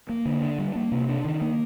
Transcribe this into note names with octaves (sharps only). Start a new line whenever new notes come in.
A#3
D3
D4
G3
A#3
C3
D4
D#3
A#3